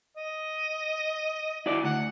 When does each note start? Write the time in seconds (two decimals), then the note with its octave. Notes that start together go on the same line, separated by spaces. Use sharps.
0.17 D#5
1.66 E4 F#4 D5
1.84 D2 F#5